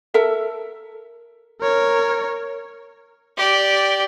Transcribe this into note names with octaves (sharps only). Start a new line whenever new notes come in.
A4 A#4 E5
A#4 C#5
G4 D5